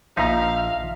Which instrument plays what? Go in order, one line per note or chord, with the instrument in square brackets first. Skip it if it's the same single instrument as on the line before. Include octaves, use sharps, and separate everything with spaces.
[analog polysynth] A#1 [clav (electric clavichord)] F3 D#4 [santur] E5 A#5 [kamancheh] F5